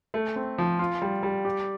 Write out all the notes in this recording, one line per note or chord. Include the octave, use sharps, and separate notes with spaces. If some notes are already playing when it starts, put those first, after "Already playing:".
A3
C4
F3
F4
G3
G3
G4